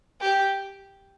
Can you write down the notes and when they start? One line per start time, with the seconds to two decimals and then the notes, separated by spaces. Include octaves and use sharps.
0.21 G4